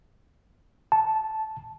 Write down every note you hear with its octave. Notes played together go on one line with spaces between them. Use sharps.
A5